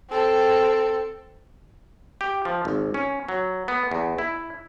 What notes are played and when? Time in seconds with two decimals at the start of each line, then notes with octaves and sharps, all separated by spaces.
0.10 C4 A4
2.21 G4
2.45 F3
2.65 G#1
2.94 C#4
3.29 F#3
3.68 B3
3.91 E2
4.18 E4